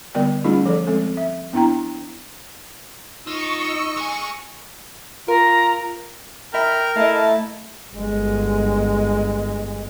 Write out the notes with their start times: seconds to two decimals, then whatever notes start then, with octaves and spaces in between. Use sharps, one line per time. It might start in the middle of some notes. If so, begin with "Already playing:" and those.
0.15 D3 G3 B3 A#4 D5 G5
0.44 G3 A3 C#4 D#4 F4 G#4
0.66 F3 A4 D5
0.87 G#3 C4 A4
1.17 E5
1.53 B3 D4 E4 G5 A#5
3.27 D#4 F4 D#5 C#6 E6
3.97 G#3 G#5
5.28 F4 A#4 A#5
6.54 E4 A#4 E5 G5 B5 F6
6.96 A3 E4 D#5 F5 A5
7.94 G1 G#3